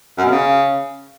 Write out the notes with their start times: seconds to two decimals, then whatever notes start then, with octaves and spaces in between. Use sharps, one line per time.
0.18 F#2
0.25 B2
0.31 C#3